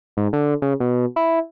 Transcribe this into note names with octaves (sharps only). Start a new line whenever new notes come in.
G#2
D3
C#3
B2
E4